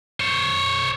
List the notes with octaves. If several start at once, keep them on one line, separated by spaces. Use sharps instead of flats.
C5 C#5